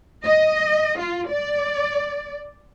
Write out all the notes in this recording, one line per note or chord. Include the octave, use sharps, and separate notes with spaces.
D#5
F4
D5